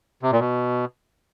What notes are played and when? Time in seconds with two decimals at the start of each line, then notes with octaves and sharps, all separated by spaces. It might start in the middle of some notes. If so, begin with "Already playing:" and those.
0.23 C3
0.32 A#2
0.40 B2